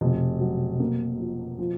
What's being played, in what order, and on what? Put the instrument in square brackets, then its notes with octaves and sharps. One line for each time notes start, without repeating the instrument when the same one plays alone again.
[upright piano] F1 [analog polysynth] B2
[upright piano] F#3
A#3
F3
F3